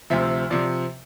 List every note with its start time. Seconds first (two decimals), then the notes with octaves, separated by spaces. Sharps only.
0.10 D2 C3 F3 E5
0.50 C3 F3 D5